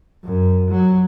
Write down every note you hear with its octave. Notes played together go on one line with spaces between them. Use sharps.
F#2
F#3